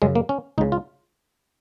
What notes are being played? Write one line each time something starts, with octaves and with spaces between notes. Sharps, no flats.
F#2 C#3 G#3
A#3
C#4
C#2 C#3 D#4
F4